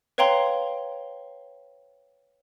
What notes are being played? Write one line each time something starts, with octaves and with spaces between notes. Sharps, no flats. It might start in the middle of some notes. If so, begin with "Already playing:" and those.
B4 C#5 F5 G5 A#5 C6